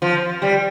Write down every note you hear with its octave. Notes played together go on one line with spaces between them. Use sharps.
F3
G3